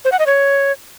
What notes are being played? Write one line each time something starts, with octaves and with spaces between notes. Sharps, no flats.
C5
F#5
D#5
C#5